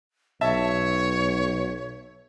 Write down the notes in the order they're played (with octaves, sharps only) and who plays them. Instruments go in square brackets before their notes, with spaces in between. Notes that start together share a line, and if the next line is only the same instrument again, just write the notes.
[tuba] B1 [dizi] C#5 [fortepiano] E5 A5